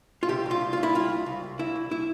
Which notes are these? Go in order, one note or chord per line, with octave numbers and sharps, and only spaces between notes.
F4
C3 G4
C2
F4
C2
F4
C2
E4
G3 F4
C2
C2
C2
C2 E4
C2
E4